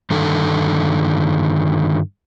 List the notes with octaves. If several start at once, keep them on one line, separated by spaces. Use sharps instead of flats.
G2 D3 D#3 A4